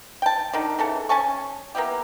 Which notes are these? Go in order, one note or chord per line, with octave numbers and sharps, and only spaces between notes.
G5 A5
D3 D#3
C#3 E3 A4
C#4 G#5 A5 C#6
A#3 B3 E4 G4